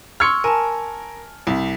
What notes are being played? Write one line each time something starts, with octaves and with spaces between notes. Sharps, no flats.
C6 C#6 E6 F6 G#6 C#7
A#4 G#5 A5
C2